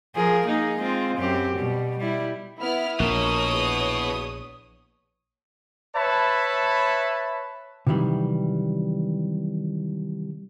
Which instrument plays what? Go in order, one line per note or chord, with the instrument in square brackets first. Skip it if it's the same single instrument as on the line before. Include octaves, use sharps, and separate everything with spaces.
[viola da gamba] F3 G#4 A#4
A#3 D#4 G#4
G#3 C4 F4
F#2 C4 G4
B2 G3
G3 E4
[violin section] B3 E4 F6
[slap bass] A#1 [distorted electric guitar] B2 [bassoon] A#4 [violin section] C#5 D#6
[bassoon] E2
[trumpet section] B4 C#5 E5 A5 B5
[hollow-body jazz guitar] C3 D#3 E3 F#3 G3